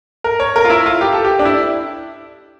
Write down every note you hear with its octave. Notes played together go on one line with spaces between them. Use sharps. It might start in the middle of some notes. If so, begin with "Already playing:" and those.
A#4
C#5
A#4
F4
E4
F4
G4
A4
G4
D4
E4